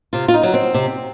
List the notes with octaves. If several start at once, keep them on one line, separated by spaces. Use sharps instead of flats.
C3 F4
F4
D#4
F#3
C4
C3